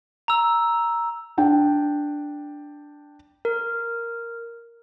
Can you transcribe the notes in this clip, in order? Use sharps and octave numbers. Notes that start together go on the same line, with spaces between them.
A#5 E6
D4 G5
A#4